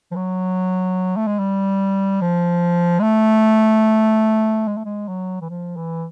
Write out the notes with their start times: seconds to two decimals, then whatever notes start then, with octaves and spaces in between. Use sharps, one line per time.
0.12 F3
0.16 F#3
1.17 A3
1.27 G#3
1.39 G3
2.21 F3
2.99 G#3
3.03 A3
4.68 G#3
4.77 A3
4.85 G#3
5.08 F#3
5.41 E3
5.50 F3
5.77 E3